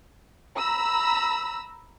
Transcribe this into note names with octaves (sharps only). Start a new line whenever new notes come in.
A#5 B5 E6